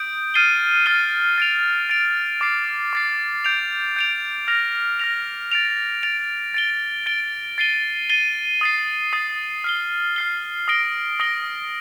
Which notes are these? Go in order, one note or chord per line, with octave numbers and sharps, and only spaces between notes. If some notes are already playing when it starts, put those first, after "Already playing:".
Already playing: D#6 G6 D7
F6 A6 C7 D#7 G7
F6 A6 C7 D#7 G7
A6 D7 F7
A6 D7 F7
D6 A6 C7
D6 A6 C7
G6 D7 F7
G6 D7 F7
F6 A#6 F7
F6 A#6 F7
A6 D7 F7
A6 D7 F7
A6 D7 G7
A6 D7 G7
A6 C7 D#7 G7
A6 C7 D#7 G7
D#6 A6 C7
D#6 A6 C7
F6 C7 G7
F6 C7 G7
D#6 A#6 D7 G7
D#6 A#6 D7 G7